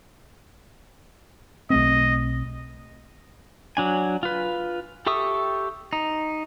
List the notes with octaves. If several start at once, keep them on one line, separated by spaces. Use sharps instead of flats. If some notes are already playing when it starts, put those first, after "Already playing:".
B1 A3 C4 D#5
F#3 D4 G#5
F4 B4
G4 A4 E5 C#6 D#6
D#4